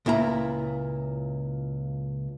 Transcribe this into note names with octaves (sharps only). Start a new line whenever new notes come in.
C#2 A#2 E4 A#5